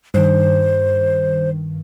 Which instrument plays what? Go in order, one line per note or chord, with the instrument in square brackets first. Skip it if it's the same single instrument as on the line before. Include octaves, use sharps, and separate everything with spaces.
[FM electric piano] G2 D#3 [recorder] C5